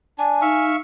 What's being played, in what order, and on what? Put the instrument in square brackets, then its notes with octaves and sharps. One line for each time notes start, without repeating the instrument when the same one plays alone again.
[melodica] D4 [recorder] G#5
[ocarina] D#4 [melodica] E5 F5 C#6